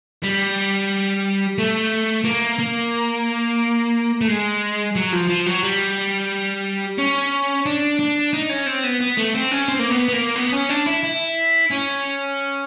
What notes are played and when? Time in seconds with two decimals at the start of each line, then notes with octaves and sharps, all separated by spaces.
0.23 G3
1.58 A3
2.25 A#3
2.59 A#3
4.21 A3
4.28 G#3
4.96 F#3
5.13 F3
5.29 F3
5.46 F#3
5.63 G3
6.98 C#4
7.66 D4
7.99 D4
8.33 D#4
8.49 C#4
8.66 C4
8.84 B3
9.01 B3
9.17 A3
9.35 C4
9.51 C#4
9.68 C4
9.79 A#3
9.90 B3
10.08 B3
10.13 A#3
10.36 B3
10.53 C#4
10.69 D4
10.86 E4
11.03 E4
11.70 C#4